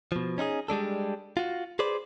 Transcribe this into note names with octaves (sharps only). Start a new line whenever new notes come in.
B2 F3
C#4 D#4 E4 G#4
G3 G#3 D4 A4
F4 F#4
G#4 B4 C5 D5